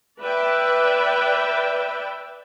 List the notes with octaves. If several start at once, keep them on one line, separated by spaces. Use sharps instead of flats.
B4 D5 E5 G5